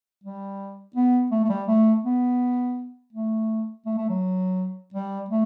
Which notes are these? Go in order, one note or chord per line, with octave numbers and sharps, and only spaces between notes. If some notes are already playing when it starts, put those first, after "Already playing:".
G3
B3
A3
A3
G3
A3
B3
A3
A3
A3
F#3
G3
A3